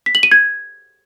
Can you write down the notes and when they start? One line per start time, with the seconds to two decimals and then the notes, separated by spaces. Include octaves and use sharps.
0.06 B6
0.15 F#7
0.23 D#7
0.32 G#6